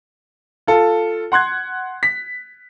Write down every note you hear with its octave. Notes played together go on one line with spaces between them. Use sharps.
F4 A4
F#5 C6 F#6 G#6
B6